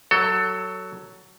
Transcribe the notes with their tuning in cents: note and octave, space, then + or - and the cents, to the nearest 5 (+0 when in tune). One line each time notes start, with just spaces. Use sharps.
F#3 +10 A4 +20